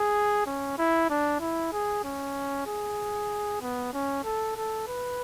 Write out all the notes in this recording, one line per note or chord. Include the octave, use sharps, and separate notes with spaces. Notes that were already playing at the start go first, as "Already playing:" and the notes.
Already playing: G#4
C#4
E4
D4
E4
G#4
C#4
G#4
B3
C#4
A4
A4
B4